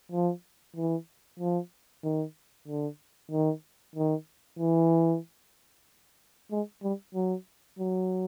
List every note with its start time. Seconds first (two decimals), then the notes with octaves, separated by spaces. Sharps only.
0.11 F3
0.76 E3
1.39 F3
2.04 D#3
2.68 D3
3.31 D#3
3.95 D#3
4.59 E3
6.51 G#3
6.83 G3
7.15 F#3
7.79 F#3